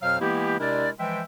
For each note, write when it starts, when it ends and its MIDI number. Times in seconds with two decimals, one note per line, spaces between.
0.02 0.19 41
0.02 0.19 47
0.02 0.19 54
0.02 0.19 72
0.02 0.19 77
0.02 0.19 89
0.20 0.57 52
0.20 0.57 56
0.20 0.57 58
0.20 0.57 59
0.20 0.57 64
0.20 0.57 67
0.60 0.89 48
0.60 0.89 56
0.60 0.89 62
0.60 0.89 64
0.60 0.89 70
0.60 0.89 74
0.99 1.22 52
0.99 1.22 53
0.99 1.22 56
0.99 1.22 76
0.99 1.22 79